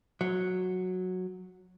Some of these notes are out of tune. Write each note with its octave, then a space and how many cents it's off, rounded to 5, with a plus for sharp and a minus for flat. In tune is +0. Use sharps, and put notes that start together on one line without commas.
F#3 -10